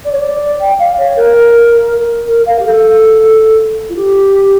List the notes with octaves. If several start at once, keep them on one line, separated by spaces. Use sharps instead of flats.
D5
C#5
D5
G5
F5
C#5
A#4
A#4
F5
G4
A4
F4
G4